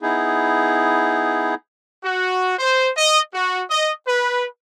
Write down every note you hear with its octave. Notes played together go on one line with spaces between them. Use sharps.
B3 D#4 E4 G#4
F#4
C5
D#5
F#4
D#5
B4